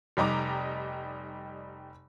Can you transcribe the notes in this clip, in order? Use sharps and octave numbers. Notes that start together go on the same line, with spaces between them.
F1 G3 D#4 A#5 D6